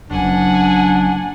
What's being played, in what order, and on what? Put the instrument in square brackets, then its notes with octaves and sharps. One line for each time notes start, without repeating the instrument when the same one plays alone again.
[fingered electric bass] F#1 F#2 [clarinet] D4 [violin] F#5 G#5